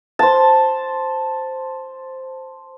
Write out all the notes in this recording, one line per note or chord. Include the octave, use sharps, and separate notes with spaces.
C5 A5